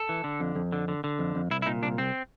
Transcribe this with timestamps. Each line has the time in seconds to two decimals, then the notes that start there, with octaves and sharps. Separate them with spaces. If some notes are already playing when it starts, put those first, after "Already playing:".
Already playing: A4
0.09 E3
0.24 D3
0.40 F2
0.56 F2
0.72 D3
0.88 D3
1.04 D3
1.19 F2
1.35 F2
1.51 C2 E4
1.62 E4
1.66 A#2 D#4
1.82 C2 D4
1.98 C2 C4